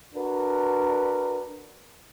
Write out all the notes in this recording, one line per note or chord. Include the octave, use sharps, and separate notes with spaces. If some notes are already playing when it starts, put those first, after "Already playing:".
D4 F#4 A#4 B4